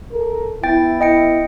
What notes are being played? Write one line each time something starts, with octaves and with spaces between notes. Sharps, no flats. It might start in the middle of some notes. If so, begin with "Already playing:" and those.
A4 A#4
B3 E4 G5 A6
D#5 G5 C#7